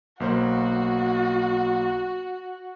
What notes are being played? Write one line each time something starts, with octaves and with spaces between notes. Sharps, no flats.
B1 A#3 F#4 C5